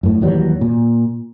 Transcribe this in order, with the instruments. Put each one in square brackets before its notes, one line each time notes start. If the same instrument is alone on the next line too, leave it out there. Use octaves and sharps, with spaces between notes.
[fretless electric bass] F#2 A2
D#2 E3 F#3 G3
A#2